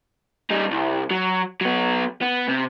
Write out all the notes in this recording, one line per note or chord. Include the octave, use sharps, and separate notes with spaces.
G3 D#4
C2
F#3
F#3 B3
B3
C3